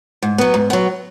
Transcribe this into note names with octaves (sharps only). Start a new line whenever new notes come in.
G#2
F#3 B3
G#2
F#3 B3